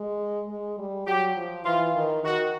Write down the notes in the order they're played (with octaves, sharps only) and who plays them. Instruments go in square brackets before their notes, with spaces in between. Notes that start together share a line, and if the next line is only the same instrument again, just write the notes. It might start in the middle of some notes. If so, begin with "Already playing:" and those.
Already playing: [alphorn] G#3
G#3
G3
[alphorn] F#3 [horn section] G4
[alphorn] F3
[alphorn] E3 [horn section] F4
[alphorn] D#3
[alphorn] D#3 [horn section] F#4